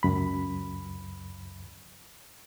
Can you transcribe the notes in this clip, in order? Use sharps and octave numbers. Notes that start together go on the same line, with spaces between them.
C#2 F#2 B5